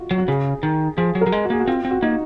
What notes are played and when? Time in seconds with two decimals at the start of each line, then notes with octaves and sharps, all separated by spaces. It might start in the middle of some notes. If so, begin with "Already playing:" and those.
Already playing: F4 F#4
0.11 F#3
0.18 F#4
0.28 C#3 G#4
0.63 D#3
0.97 F3 G#4
1.15 F#3
1.21 A#4
1.26 F#3
1.32 G#3
1.45 F#4
1.50 A#3 G#4
1.60 F#4
1.68 C4 F4
1.85 C4
1.90 F#4
2.02 A#3 D#4